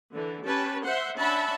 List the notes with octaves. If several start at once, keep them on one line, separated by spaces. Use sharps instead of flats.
D3 E3
C#4 G4 B4 A5
C5 E5 F#5 C6
C#4 D4 E5 F#5 A5 B5